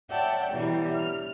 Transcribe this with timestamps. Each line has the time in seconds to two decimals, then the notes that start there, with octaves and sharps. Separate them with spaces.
0.10 C#5 D5 E5 F#5 G5 A5
0.53 B2 E3 F#3 G3 E4 G4
0.94 F6